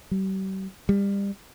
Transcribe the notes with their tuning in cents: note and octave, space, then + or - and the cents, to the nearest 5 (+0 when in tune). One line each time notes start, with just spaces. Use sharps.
G3 -40
G3 +30